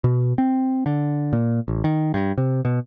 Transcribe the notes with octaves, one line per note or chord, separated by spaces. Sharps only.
B2
C4
D3
A#2
A1
D#3
G2
C3
B2